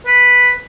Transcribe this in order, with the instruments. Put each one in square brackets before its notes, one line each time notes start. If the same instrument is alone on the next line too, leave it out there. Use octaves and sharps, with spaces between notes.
[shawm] B4